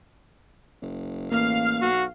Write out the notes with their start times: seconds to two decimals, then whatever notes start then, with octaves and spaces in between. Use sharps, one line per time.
0.82 F#1
1.32 A1 A#3 F5
1.82 B1 F#4